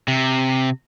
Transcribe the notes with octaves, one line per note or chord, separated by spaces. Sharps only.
C3